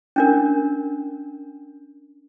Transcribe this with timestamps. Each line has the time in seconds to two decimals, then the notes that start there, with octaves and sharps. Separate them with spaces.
0.16 C#4 D4 A#4